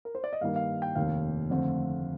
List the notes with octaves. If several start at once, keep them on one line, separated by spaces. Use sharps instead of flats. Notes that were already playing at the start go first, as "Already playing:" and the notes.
A#4
C5
D5
D#5
G2 D#3 G3 A#3 D#4 F5
F5
G5
F1 D#2 D#3 F5
F2 D3 A3 C4